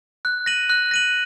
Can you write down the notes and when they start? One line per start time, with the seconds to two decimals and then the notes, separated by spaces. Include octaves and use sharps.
0.25 F#6
0.46 A#6 D#7 F#7
0.70 F#6
0.91 A#6 D#7 F#7